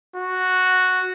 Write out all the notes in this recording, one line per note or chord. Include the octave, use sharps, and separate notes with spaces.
F#4